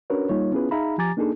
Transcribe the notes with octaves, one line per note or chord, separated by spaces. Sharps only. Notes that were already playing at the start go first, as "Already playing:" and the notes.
C#4 D4 F#4 A#4 B4 C#5
G3 A#3 D#4 F4 C#5
B3 C#4 E4 F4 G#4 B4
D#4 G#4 E5 F5 A#5 B5
F3 G4 G#5 A#5 D6 A6
A#3 D4 D#4 G#4 A4